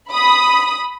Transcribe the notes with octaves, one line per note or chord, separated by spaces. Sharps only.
B5 D#6